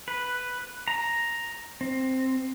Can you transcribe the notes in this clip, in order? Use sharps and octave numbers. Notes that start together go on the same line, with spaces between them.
B4
A#5
C4